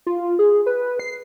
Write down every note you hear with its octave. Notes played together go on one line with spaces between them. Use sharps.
F4
G#4
B4
C7